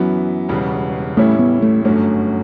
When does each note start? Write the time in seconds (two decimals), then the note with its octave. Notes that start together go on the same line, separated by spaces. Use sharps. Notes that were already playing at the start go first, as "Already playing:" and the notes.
Already playing: F#2 E3 F#3 B3
0.48 E1 E2 C#3 G3 B3
1.17 A1 A2 G3 A3 C#4 E4
1.39 B3
1.62 A3
1.84 G1 F#2 D3 F#3 A3 C#4